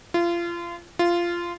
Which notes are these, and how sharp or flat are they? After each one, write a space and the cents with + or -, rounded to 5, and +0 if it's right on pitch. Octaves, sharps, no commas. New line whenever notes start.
F4 -30
F4 -15